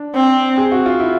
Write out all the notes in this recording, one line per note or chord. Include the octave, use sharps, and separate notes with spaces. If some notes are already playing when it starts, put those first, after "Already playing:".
Already playing: D4
C4
G#4
F#4
F4
E4